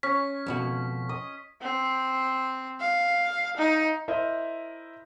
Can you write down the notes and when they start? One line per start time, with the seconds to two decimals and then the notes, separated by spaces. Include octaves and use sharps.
0.03 C#4 B6
0.46 F2 B2 F#4
1.09 D#5 D#6
1.62 C4
2.80 F5
3.57 D#4
4.08 E4 A#4 C5 D#5 E5